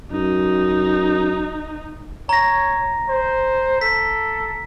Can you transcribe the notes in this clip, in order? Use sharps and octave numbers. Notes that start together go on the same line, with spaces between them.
F#2 D#4
C#5 A#5 A#6
C5
A4 B6